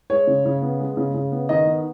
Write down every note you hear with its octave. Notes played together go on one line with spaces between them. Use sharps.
G#3 C#5
C#3
C#3
B3
G#3
C#3
C#3
B3
D#3 D#5
B3